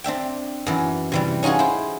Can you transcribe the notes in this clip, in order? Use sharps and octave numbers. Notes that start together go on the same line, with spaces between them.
C4 D4 E5 G5
F#2 E3
C3 E3 G3
C#4 D#4 F4 F#4 G#4
E4 C5